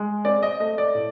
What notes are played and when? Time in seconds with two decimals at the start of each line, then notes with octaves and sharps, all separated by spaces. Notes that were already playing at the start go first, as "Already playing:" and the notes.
Already playing: G#3
0.25 C4 D5
0.43 D#5
0.60 A3 D#5
0.78 D5
0.95 A2